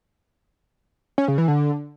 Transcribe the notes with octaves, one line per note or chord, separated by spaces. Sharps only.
C#4
C#3
E3
D3